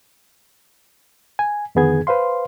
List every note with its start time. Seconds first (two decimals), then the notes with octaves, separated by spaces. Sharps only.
1.39 G#5
1.75 F2 D3 D#3 B3 G#4 G#6
2.07 B4 C5 F5 C6